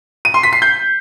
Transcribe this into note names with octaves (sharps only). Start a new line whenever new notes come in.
D#7
C6
B6
C7
G6